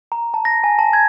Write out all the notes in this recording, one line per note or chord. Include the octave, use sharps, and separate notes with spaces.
A#5
A5
A#6
G#5
A5
G#6